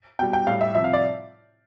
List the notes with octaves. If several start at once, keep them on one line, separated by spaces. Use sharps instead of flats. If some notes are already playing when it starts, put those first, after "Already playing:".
B2 G3 G5
G5
A2 G3 F5
E5
C3 F3 E5
F5
D5